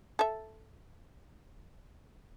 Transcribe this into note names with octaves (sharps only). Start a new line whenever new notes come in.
A4 E5